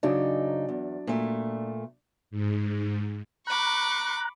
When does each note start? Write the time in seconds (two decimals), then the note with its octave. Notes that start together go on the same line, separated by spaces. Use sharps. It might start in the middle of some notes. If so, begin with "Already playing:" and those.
0.03 F#2 C#3 F#3 D4 D#4 D5
0.69 E2
1.07 A#2 A3
2.31 G#2
3.47 A#5 B5 C#6 D6 F#6